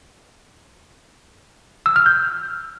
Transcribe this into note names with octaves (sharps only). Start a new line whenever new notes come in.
E6
F6
G6